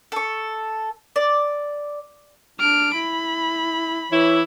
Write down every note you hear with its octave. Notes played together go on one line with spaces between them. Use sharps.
A4 C#6
D5
D4 F6 D7
E4 B5
E3 E4 C#5